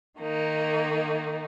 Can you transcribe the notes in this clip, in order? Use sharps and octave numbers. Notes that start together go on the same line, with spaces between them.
D#3 A#3 D#4